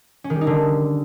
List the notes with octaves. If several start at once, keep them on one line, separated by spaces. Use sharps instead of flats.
C#4
D#3
G3
D#4
D3